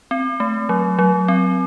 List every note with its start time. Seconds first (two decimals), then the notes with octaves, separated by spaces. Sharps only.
0.11 C4
0.40 A3
0.69 F#3
0.99 F#3
1.28 C4